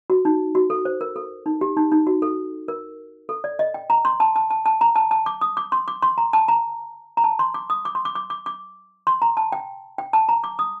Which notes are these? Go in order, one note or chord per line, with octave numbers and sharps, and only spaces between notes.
F#4
D#4
F#4
A4
C5
A#4
A4
D#4
G4
D#4
D#4
F#4
A4
A#4
A4
D5
D#5
G5
A#5
C6
A5
A5
A5
A5
A#5
A5
A5
D6
D#6
D6
C6
D6
C6
A#5
A5
A#5
A#5
A5
C6
D6
D#6
D6
C6
D6
D6
D6
D6
C6
A#5
A5
G5
G5
A5
A#5
D6
D#6